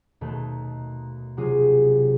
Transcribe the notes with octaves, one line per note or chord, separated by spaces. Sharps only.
D#2 B2 D#3 A3
C3 F#3 F4 G#4